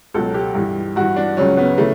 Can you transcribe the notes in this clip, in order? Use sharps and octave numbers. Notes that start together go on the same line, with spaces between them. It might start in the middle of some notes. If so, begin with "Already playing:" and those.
C#2 B2 F#3 A4
G4
G2 E3
G2 E3 F#4
D4
C#2 C#3 F#3 C#4
B3
C#3 E3 A3